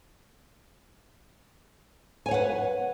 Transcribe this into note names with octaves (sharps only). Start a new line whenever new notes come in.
B4 C#5 F#5 G#5